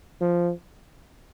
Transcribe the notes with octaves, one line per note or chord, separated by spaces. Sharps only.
F3